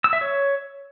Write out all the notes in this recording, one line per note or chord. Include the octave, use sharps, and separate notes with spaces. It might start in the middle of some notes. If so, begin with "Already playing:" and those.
E6
E5
C#5